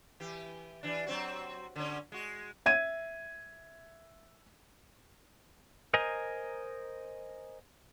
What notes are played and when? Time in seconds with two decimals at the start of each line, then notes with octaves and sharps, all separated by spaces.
0.20 E3 G4
0.83 E3 D4
1.06 F#3 C4 F#4
1.76 D3 C#4
2.12 G#3 F#4
2.66 E5 G#6 D#7
5.94 A#4 C5 D#5 G#5 A#5